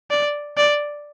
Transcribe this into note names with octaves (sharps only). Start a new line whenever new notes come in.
D5
D5